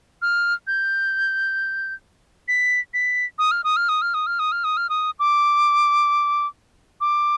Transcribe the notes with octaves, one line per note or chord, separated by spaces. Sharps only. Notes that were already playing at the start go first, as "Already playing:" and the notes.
F6
G6
B6
B6
D#6
F6
D#6
F6
D#6
F6
D#6
F6
D#6
F6
D#6
F6
D#6
D6
D6